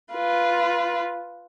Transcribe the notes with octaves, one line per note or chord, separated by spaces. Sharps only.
F4 B4